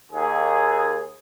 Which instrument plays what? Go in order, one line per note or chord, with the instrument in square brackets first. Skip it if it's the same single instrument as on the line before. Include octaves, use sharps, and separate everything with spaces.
[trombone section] D#2 G#4